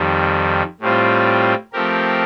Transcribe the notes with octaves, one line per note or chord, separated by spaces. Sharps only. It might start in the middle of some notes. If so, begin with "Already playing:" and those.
Already playing: F2 D#3 G3
A2 G3 C4 F4
F3 A3 C4 G4 A#4